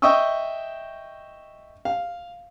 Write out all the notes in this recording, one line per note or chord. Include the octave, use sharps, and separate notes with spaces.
D#5 E5 G5 C#6 D#6 E6
F5